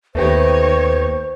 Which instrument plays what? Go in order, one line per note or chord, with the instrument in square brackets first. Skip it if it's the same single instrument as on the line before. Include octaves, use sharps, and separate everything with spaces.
[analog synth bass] D#2 [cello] D#3 C#5 [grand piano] A3 B3 G4 [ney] C5